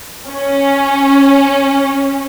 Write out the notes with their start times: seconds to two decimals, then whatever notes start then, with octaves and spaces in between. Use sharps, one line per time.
0.29 C#4